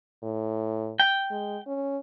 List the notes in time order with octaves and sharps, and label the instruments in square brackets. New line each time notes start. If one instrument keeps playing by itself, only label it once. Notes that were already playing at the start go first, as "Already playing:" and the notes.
[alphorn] A2
[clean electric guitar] G5
[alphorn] G#3
C#4